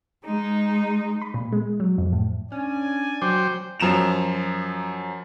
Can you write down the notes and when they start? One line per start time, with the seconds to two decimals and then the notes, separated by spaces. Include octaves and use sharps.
0.25 G#3 D#4
1.22 B5
1.34 A#2
1.52 G#3
1.80 F#3
1.98 F2
2.13 A2
2.52 C#4 D4 D5 G#5
3.22 F#3 C5 G5 D6 G6
3.80 F#2 F3 A#5 E7 F7